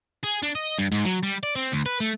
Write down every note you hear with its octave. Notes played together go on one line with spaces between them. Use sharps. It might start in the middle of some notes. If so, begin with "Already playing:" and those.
G#4
D4
D#5
G2
G#2
F#3
G3
D5
C4
D2
B4
A3